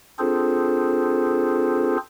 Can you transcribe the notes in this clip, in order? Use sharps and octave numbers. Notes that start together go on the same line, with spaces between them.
C4 D4 F4 G#4 A4 C5